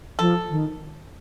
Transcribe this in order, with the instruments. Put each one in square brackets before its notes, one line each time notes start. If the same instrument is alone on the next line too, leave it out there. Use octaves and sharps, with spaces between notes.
[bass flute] F3 [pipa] A4
[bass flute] D#3